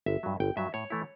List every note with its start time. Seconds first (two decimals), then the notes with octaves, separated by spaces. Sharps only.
0.06 G1 E5
0.23 G2 F#3
0.40 G1 G5
0.57 G2 F#3 E5
0.74 A2 C#5
0.90 E3 A3 E4